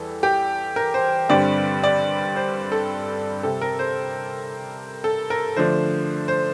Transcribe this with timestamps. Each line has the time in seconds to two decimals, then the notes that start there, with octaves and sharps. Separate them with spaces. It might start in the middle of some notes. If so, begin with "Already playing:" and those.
Already playing: E2 E3 G3 A4
0.23 G4
0.76 A#4
0.94 C5
1.29 G2 D3 G3 C4 D5
1.83 D5
2.36 C5
2.72 A4
3.43 C3 G3 C4 A4
3.61 A#4
3.79 C5
5.04 A4
5.30 A#4
5.57 D3 F3 A3 D4 C5
6.28 C5